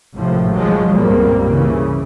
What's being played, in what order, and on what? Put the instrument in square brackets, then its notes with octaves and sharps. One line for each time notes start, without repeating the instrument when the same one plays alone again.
[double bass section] G#1 A2 C3 F3
F3 F#3 G#3
C#2 G2 A#2 G3 A#3 C4
C#3 E3